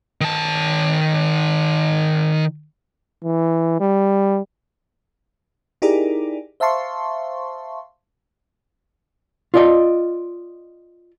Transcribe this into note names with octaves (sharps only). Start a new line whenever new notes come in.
D#3 A5
E3
G3
D#4 E4 G4 G#4 A#4 D5
C5 E5 F5 A5 C6 C#6
F4 D5 D#5